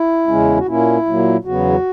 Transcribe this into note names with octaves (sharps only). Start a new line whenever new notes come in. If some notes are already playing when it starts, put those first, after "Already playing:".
Already playing: E4
E2 C#3 G#3 C#4
F#4
A#2 A#3 C#4 E4
A#2 F#3 A#3
E2 C#3 F#3 B3 F#4